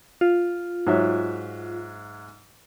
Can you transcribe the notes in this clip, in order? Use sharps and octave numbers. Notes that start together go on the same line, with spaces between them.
F4
G#2 F#3 E5